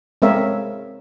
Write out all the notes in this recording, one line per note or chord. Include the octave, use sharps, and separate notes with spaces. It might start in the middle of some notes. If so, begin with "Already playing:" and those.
G#3 C4 A#4 C#5 E5 F5